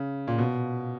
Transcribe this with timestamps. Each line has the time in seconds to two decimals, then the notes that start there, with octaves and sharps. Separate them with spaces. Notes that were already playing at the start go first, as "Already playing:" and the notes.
Already playing: C#3
0.28 A#2
0.38 B2